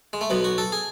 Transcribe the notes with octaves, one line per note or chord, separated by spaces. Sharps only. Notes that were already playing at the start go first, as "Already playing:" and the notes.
G#3
A3
B1 B2 B3
F#4
A4
G#4